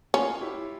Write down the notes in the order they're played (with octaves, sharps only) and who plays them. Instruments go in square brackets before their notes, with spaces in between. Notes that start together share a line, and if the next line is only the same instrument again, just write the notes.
[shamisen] C#4 [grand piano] F4
[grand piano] E4 G4